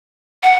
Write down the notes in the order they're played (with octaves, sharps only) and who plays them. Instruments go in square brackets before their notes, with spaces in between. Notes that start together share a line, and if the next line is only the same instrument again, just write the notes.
[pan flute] F#5